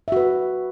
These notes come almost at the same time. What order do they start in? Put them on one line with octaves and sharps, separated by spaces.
E5 F#4 B4